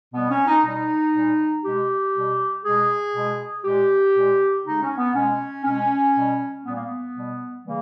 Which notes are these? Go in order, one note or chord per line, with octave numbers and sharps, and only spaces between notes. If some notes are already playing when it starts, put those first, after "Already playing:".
B2 G3 B3
C#4
D#4
B2 G3 D#4
A#2 G3
B2 G#3 G4
B2 G3
B2 G#3 G#4
B2 G#3
A#2 G#3 G4
A#2 G#3
C#3 G#3 D#4
C#4
B3
B2 G#3 C#4
B2 G#3 C#4
B2 G3
A#2 G3 B3
A#3
B3
B2 G3
C#3 E3 G3 A#3